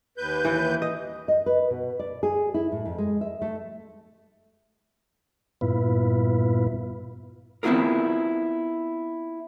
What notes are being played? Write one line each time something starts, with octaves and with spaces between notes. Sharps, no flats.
D#2 B4 G6
E3
D#5
D#5
B4
B2
D5
G#4
E4
A2
F2
G#3
E5
A3
G2 A#2 B3 E4 F4 B4
B3 C4 E4 F4 G#4 A#4